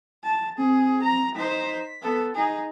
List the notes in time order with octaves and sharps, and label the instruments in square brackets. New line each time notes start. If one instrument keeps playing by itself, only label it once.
[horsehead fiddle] A5
[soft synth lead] C4 [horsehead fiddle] G#4
[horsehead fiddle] A#5
[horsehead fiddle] D#4 C5 [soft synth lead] B6
[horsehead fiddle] B3 A4
D#4 G#4